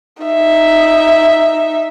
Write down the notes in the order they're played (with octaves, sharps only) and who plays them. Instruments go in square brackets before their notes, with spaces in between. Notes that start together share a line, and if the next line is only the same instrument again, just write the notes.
[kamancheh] D#4 E5